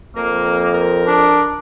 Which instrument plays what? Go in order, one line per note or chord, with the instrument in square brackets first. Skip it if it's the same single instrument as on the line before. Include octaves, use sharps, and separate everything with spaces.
[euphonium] F2 [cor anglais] A#3 [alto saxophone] A#4
[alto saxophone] A#4
A#4
[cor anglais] D4